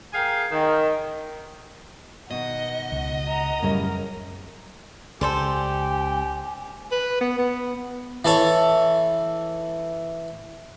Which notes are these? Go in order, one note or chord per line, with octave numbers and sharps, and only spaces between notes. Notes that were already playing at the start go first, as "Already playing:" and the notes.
G#4 A#4 F5 G5 G#5
D#3
B2 D#3 D#5 F#5
C#2
F#5 A#5
F#2 A2 C#3 F#3 G3 A#4
C#2 C#3 G4 A4 C5 D5 G#5
B4
B3
B3
E3 A4 C#5